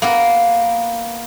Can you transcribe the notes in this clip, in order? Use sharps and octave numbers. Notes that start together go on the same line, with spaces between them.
A#3 B3 A#4